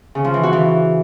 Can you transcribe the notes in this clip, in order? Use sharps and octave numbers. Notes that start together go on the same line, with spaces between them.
C#3
F3
E3
F#4
E3